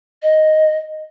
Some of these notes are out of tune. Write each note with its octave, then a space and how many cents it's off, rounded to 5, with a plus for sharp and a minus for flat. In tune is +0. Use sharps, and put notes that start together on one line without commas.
D#5 +0